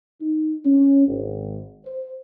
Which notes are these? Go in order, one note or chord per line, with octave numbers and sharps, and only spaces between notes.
D#4
C#4
G#1
C5